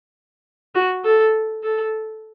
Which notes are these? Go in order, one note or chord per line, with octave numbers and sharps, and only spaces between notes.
F#4
A4
A4